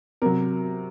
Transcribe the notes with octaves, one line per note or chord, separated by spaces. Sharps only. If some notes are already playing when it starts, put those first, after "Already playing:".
C3 F#3 A#4